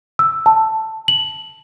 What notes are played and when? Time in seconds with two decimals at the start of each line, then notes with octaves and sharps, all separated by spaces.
0.19 E6
0.46 A5
1.08 F#7